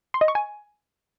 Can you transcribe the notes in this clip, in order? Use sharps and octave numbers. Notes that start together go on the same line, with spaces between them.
C6
D#5
C#6
G#5